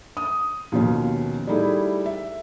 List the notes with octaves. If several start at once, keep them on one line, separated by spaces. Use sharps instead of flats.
D#6
D#2 B2 F3 C#4
G3 A3 D#4 E4 G#4
E5